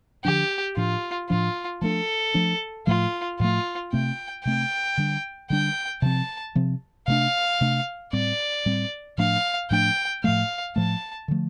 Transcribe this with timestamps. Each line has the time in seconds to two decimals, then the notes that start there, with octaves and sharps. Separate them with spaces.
0.24 D3 F3 D4 G4
0.76 A2 F3 D4 F4
1.29 A2 F3 D4 F4
1.81 F3 A3 D4 A4
2.34 F3 A3 D4
2.87 A2 F3 A3 F4
3.40 A2 F3 A3 F4
3.93 C3 A3 C4 G5
4.44 C3 A3 C4 G5
4.97 D3 G3 D4
5.50 D3 G3 D4 G5
6.02 C3 F3 C4 A5
6.55 C3 F3 C4
7.07 C3 A3 D4 F5
7.61 C3 A3 D4
8.13 A2 G3 C4 D5
8.66 A2 G3 C4
9.18 A2 F3 A3 D4 F5
9.70 A2 F3 A3 D4 G5
10.24 A2 F3 A3 F5
10.76 A2 F3 A3 A5
11.28 D3 F3 A3